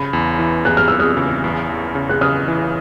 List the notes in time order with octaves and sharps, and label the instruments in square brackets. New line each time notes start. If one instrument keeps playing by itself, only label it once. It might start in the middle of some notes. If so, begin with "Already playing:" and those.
Already playing: [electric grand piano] C#3 [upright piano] B5
[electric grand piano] E2
E3
[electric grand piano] E2 [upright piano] F#6
[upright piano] F6
[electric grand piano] E2 [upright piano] E6
[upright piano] D#6 F6
[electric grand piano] C#3
E2
E2
C#3
[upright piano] F#6
[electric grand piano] C#3 [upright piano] D#6 F6
[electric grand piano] E3